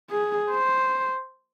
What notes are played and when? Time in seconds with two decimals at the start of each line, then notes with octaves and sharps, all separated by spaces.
0.11 G#4
0.51 C5